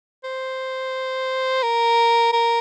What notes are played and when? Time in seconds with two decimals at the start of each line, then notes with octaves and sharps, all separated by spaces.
0.24 C5
1.63 A#4
2.33 A#4